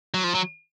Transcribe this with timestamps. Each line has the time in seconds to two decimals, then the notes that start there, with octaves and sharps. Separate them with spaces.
0.14 F#3
0.24 F3
0.34 F#3